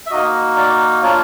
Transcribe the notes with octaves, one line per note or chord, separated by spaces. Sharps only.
E5
A#3 D#4 F#4 D#5
D5
A#3 D4 F4 C#5